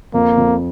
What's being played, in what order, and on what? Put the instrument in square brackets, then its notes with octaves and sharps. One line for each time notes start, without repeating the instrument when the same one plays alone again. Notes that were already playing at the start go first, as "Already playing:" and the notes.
[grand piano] F2 [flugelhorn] A#3
[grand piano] F2